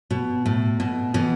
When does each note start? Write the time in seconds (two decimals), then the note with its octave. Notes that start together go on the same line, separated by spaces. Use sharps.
0.11 B2
0.46 A2
0.80 B2
1.14 B2 E3